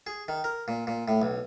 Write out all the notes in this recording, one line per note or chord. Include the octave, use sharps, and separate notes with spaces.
G#4
D#3
A#4
A#2
A#2
A2
B1